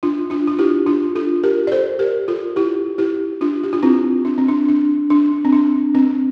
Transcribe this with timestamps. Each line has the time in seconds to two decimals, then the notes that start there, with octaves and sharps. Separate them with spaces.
0.03 D4 F4
0.30 D4 F4
0.47 F4
0.59 E4 G4
0.86 D4 F4
1.15 F4 A4
1.43 G4 A#4
1.67 D5
1.72 A4 C5
1.99 G4 A#4
2.28 F4 A4
2.56 E4 G4
2.98 E4 G4
3.41 D4 F4
3.64 G4
3.73 F4
3.83 C4 E4
4.25 D4
4.38 C4
4.48 D4
4.68 D4
5.10 D4
5.45 C4
5.52 D4
5.95 C4